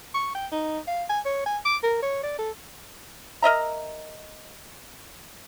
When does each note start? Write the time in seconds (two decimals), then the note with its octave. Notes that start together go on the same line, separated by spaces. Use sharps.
0.14 C#6
0.35 G5
0.52 D#4
0.87 F5
1.09 G#5
1.25 C#5
1.46 G#5
1.65 D6
1.83 A#4
2.02 C#5
2.23 D5
2.39 A4
3.42 A#4 D#5 E5 A#5